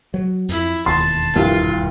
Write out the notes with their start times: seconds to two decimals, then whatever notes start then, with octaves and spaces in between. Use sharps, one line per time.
0.14 F#3
0.49 F2 E4
0.86 E1 D#2 A5 C6
1.36 C2 G2 F4